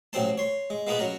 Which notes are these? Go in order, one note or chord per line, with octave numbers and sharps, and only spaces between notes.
A1 F#3 C4 C5 A5
C#5 C6
G#3
G#3 A#3 B3 F4 G#4 B4
F#3 C#4 A#4